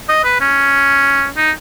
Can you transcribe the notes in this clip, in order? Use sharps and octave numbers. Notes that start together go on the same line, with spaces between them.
D#5
B4
C#4
D#4